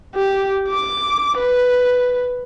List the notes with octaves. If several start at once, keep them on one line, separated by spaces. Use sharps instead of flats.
G4
D6
B4